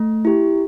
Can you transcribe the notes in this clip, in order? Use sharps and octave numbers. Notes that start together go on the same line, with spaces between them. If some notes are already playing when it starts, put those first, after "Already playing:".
Already playing: A3
E4 G4